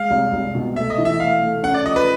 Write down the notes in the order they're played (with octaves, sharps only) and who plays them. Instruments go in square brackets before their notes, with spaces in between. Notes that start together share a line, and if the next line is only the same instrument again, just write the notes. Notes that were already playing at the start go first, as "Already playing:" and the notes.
Already playing: [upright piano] G#3 [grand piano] F5
[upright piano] C2
C2
B2
[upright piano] A3 [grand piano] E5
[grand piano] D#5
[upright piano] E3
[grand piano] E5
[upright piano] A3 [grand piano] F5
[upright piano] A3
[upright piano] C#4 [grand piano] F#5
[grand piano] D5
[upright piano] F3 [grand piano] D#5
[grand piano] B4